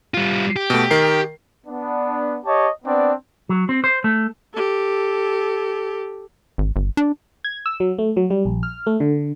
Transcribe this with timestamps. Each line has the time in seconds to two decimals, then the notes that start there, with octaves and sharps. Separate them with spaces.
0.14 G3 F4
0.56 G4
0.70 B2 A3
0.91 D#3 A#4 C7
1.67 B3 D4
2.46 G4 C#5 D#5 A5
2.85 B3 C4 D4 D5
3.49 F#3
3.69 C4
3.84 C5
4.04 A3
4.54 G4 A4
6.58 G#1
6.76 G1
6.97 D4
7.44 G#6
7.66 E6
7.80 F#3
7.98 A3
8.17 F#3
8.30 G3
8.45 A#1
8.63 F6
8.87 A3
9.00 D3